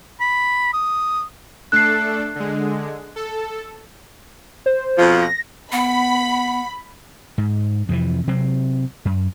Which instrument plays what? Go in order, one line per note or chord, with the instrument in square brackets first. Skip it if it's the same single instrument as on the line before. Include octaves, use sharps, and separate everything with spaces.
[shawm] B5
D#6
[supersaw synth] A3 D4 A4 [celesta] F#6 C7
[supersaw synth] D3 G#3
A4
[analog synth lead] C5
[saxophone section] F2 B2 F3
[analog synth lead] A#6
[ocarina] B3 [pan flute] F#5 [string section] B5
[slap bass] G#2
F2 C3 E3
C3 F#3 C4
F#2